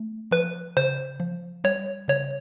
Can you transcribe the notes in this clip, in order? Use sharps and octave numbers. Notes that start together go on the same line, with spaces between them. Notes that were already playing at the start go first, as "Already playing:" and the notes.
Already playing: A3
F3 B4
C#3 C5
F3
G3 C#5
C#3 C#5